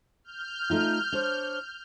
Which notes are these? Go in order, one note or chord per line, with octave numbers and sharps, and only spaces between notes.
F6 G6
A3 D#4 F4
D4 C5 C#5